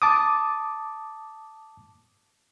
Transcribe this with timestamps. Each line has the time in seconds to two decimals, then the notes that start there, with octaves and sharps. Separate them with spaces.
0.02 A5 D6 D#6